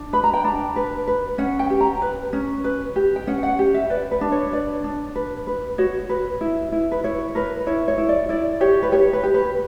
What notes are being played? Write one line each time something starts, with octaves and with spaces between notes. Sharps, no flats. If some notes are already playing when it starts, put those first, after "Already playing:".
Already playing: D4
B4 B5
A#5
G5
D4 A#5
B4
B4
C#4 F#5
G5
G4
A#5
B4
C#4
B4
G4
G5
C#4 F#5
F#5
G4
E5
B4 D5
B4
D4
C#5
B4 D5
D4
B4
B4
F#4 C#5
B4
E4
E4
B4
E4 C#5
A#4 B4
E4 C#5
C#5
E4
D5
E4 D5
G4 C#5
B4
G4 C#5
B4
G4
B4